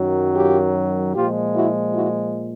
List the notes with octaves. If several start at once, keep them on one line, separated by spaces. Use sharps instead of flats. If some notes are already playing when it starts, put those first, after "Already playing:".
Already playing: F#2 D#3 F#3
F4 G4
A#2 F3 G#3 F4 G4
E4 F#4
E4 F#4